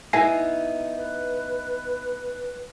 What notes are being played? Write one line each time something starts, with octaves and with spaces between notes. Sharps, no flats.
B3 D#4 E4 G#5 A#6 C7
B4